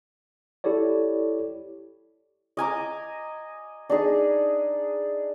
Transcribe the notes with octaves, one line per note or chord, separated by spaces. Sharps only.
E4 G4 A4 C#5 D5
D#5 G#5 A#5 D6
D4 D#4 G#4